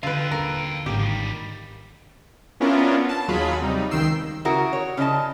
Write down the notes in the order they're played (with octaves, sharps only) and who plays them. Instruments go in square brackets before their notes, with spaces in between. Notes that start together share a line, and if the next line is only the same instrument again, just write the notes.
[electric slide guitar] D3 [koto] F4 B4 [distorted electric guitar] F5 G5
[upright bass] D#1 [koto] A#4
[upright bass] G#1 G#2 [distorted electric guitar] C#3 A#3 [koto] G4
[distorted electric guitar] D#3 G3
[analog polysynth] B3 C#4 D4 E4 F4 A#4
A5
D#2 F#3 F4 G#4 B5
C3 G3 D#4
C#2 D#3 G5 E6 C7
[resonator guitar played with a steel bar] C#3 E4 F#4 A#4
C#5
C#3 D4 E4 D#5 A5